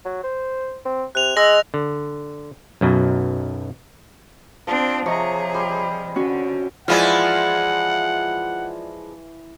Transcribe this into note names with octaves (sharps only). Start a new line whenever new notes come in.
F#3
C5
C4
C3 F#6 F7
G#3 D#5 E6 A#6 F#7
D3
B1 F#2 B2
F3 C4 D4
C3 F3 G#4 C#5 D#5 A#5
G3 C6
D3 C#4 F#4
E3 F3 G#3 E4 F4 D5 F5 F#5